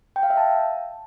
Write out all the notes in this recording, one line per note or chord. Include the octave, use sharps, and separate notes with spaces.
G5
F5
E5
A5